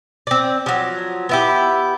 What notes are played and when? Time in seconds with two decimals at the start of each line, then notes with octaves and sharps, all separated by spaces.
0.27 C4 D5
0.66 F3 F#3
1.29 B3 E4 G4